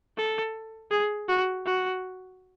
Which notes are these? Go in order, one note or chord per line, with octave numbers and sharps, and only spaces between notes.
A4
G#4
F#4
F#4